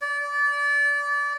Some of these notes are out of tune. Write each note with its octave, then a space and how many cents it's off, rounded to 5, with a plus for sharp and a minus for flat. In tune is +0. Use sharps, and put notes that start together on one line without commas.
D5 -25